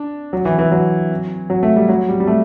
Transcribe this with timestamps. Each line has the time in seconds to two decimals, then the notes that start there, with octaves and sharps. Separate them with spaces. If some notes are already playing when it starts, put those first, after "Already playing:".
Already playing: D4
0.33 F#3
0.45 E3
0.59 E3
0.72 F#3
1.50 F#3
1.63 A3
1.76 G3
1.88 F#3
2.09 G3
2.20 G3
2.27 A3